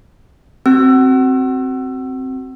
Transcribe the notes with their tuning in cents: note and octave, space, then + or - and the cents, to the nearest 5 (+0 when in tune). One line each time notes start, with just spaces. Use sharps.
C4 +0 F#4 +20 E6 +20